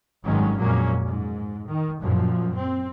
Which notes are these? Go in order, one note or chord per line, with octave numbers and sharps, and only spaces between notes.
G#1 G2 D#3 F#3 G#3 C#4
F2 A#2 F#3 G#3 A#3 C#4
G#2
D#3
F#2 A#2 F3
C4